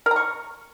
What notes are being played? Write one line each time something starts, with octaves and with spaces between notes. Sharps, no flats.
A#4
A#5
C#6